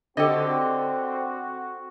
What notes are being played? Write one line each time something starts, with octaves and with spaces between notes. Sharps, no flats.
D3 C4 F#4 G4 A4 D#5